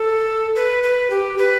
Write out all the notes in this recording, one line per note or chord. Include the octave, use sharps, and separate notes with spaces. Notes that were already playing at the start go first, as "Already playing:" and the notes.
Already playing: A4
B4
B4
G4
B4